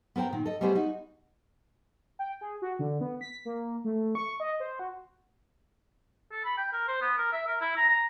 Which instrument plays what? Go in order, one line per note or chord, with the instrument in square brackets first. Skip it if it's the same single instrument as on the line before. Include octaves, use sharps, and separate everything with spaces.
[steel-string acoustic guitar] B3 A#4 C5 G5 A#5
A#2 D#3
A4 D#5
G3 A3 B3 F#4 G#4 C5
D#4 F#4
[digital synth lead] G5
G#4
F#4
D3
B3
B6
A#3
A3
C#6
D#5
C5
F#4
[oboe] A4
B5
G5
A#4
C5
B3
A#4
E5
A#4
E4
A#5
A#5